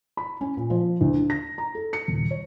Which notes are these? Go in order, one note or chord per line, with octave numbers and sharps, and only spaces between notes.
B5
C#4
A#2
F3
D2
D4
A#6
A#5
A4
C#7
D#1
C#5